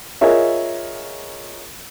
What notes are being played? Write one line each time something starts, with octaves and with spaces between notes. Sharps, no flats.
F4 G#4 A#4 C#5 D#5 E5